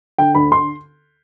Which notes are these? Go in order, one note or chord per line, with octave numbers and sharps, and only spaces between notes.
D3 G5
D2 B5
D3 C6